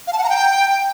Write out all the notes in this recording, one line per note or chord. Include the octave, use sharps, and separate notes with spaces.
F5
A5
F#5
A#5
G5